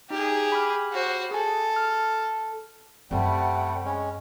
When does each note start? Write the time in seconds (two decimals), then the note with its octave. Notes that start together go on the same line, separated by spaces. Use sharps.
0.10 D#4 G4 G#4
0.52 B5 D6 F6
0.92 F#4 C5
1.31 G#4 A4 G#5
1.76 F6
3.11 F#2 C3 G3 A3 C4 F#5 G5 B5
3.85 G#3 C#4